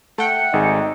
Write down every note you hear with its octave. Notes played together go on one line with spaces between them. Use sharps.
A3 F#5 G5
G#1 D#4 G#4